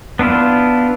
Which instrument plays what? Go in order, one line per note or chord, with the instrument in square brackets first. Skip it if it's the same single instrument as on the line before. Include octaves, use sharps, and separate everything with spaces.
[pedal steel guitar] B3 D4 E4 F4